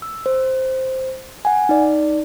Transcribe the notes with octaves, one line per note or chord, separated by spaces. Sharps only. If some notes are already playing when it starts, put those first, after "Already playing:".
E6
C5
F#5 G#5
D#4 D5